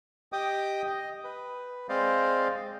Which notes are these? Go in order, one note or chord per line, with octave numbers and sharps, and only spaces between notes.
G4 D#5 G5 D6 D#6
D#5
B4
G#3 C4 C5 D5 D#5 F5